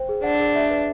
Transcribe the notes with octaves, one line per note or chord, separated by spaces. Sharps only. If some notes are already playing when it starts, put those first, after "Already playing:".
Already playing: C5 G5
G#4
D4 F#5
G#4
E5
B4